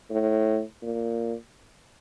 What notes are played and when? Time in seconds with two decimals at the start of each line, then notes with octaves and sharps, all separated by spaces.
0.10 A2
0.83 A#2